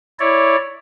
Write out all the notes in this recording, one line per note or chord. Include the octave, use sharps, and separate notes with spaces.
E4 C#5 D5